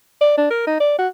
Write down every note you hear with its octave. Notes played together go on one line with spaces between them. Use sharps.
D5
D4
A#4
D#4
D5
F#4